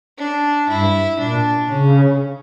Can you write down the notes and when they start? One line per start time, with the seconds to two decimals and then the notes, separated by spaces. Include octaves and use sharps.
0.18 D4
0.69 G2 E4
1.19 A#2 D4
1.70 C#3 C#4